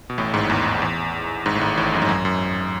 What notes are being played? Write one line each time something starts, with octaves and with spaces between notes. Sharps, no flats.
B2
A1 A2
G#1 G#2
E2
E2
G#1 G#2
A2
G#1 G#2
A1 A2
F#2
G#2
F#2
F#2